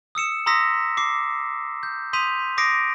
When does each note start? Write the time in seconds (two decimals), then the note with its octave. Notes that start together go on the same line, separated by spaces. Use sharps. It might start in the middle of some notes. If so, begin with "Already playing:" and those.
0.15 D#6 E6 C#7 E7
0.46 A#5 C6 D#6 E6 A#6 B6
0.97 D6 C7
1.83 G6
2.13 C6 D#6 G6 B6 D#7 F7
2.58 D6 D#6 A#6 C7 D7